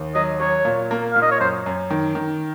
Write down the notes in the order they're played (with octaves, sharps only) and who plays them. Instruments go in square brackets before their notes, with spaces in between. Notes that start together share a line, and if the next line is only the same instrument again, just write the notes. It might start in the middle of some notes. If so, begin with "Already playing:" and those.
Already playing: [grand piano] D#2
[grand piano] F#3 [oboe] D#5
[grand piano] F#3 [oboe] C#5
[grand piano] A#2
A#3
[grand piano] A#2 [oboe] F5
[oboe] D#5
C#5
[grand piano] F#2 [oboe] C5
[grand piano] F#2
D#3
D#3